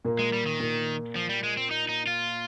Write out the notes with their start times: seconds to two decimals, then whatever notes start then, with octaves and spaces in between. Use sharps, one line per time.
0.05 A#2 A#3
0.19 G#3
0.33 G3
0.46 D#3
0.60 A#2 A#3
1.16 F3
1.29 G3
1.43 G#3
1.57 C4
1.71 D#4
1.89 D#4
2.07 F4